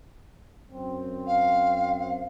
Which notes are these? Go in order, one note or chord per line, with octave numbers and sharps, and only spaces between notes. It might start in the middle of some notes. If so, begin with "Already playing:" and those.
F#2 C4
F5